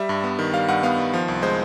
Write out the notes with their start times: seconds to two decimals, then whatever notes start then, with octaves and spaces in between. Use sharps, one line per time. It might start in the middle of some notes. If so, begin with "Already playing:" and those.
Already playing: G3 E5
0.09 G2
0.24 B3
0.39 D#3
0.54 G3 F5
0.68 G2 F#5
0.83 B3 F5
0.98 D#3
1.14 F3
1.28 C2
1.42 G#3 C5